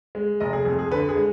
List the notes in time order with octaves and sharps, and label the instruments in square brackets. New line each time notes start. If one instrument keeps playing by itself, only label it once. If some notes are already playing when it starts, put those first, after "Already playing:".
[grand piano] G#3
F1 D#5
G#4
F2 G#4
G#4
D3 B4
G#4
G#3